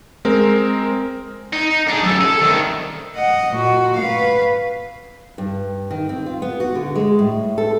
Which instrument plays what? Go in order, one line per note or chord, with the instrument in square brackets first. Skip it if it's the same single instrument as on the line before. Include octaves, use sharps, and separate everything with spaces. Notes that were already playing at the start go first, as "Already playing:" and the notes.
[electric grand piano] G#3 C4 A#4
[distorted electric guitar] D#4
D4 G#4
F#2 A4
G#4 A4
C2 D#3
[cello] D#5 F#5
A#2 F#4
B4 F5
[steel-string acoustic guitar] G2
D#3
C4
F4
B3
F#4
D3
G#3
A2
A4